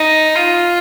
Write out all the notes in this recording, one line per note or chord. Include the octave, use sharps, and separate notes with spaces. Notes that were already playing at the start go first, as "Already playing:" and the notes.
Already playing: D#4
F4